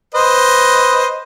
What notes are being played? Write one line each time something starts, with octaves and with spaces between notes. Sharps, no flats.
B4 C5 D#5